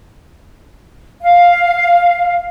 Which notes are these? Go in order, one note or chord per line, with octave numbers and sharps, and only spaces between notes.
F5